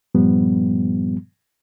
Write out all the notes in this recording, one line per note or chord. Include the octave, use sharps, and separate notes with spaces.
G2 A#2 F3 G3 B3